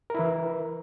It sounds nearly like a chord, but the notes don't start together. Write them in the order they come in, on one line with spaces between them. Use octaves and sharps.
A#4 E4 E3